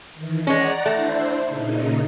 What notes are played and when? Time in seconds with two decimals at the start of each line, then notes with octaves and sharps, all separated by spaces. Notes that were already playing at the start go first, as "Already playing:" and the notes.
0.15 D#3 E3
0.47 G#3 C#4 D5 F#5 A#5
0.86 A3 D4 E4 C5
1.47 A#2 C#3 D#4